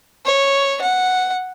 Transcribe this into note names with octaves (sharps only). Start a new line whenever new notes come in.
C#5
F#5